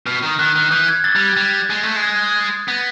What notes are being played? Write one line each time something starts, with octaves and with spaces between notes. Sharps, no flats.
B2 F6
D#3
D#3 F#6
D#3
E3 G6
G#6
A6
G3
A6
G#6
G3 A6
G#3
A3
G#3
G#6
A6
B3 A#6